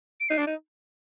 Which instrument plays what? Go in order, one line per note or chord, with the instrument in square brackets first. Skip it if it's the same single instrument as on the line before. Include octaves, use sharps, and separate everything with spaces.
[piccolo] D7
[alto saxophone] D#4 [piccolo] C7
[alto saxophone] D4
D#4